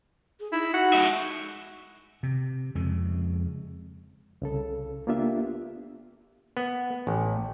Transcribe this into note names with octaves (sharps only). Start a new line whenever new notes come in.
G#4
D#4 E4
F#4
G#3 E5
C3
F2 C#3 G#3
C2 C#3 A4
A#3 B3 D4 F4 G4 E5
B3
A1